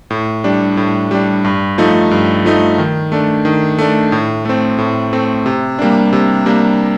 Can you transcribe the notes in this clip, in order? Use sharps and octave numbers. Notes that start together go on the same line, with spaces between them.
A2
G3 D4
A2
G3 D4
G2
F3 A3 D#4
G2
F3 A3 D#4
D#3
A3 D4
D#3
A3 D4
A2
A3 C4
A2
A3 C4
C3
G3 A#3 D4
C3
G3 A#3 D4